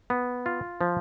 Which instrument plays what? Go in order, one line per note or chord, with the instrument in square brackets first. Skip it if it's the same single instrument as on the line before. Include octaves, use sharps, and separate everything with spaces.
[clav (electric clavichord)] B3
F4
F3